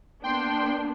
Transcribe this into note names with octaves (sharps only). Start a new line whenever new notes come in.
A#3 B3 D4 G5 C6